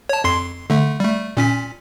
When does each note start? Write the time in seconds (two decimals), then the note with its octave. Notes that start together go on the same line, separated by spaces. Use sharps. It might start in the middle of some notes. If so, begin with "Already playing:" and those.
0.09 C#5 A5
0.24 F2 C6 C7
0.70 D3 A3
1.00 G3 A3
1.37 A#2 C#4 B6